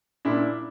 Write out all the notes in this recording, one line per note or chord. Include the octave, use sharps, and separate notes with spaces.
A#2 D4 E4